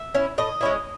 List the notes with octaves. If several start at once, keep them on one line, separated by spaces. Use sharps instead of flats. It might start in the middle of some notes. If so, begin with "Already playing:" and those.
Already playing: E5
C#4 E4
A2 D#5
G#3 C#4 E4